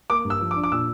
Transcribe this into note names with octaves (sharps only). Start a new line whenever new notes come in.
A#3 D6
G2
E6
F3
D6
D4
D6
A#2 E6